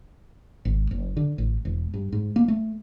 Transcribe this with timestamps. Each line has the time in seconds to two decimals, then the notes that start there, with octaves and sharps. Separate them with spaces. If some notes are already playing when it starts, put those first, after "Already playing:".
0.65 G#1
0.91 F#1
1.17 D3
1.38 A1
1.65 E1
1.94 G2
2.12 G#2
2.36 A#3
2.48 A3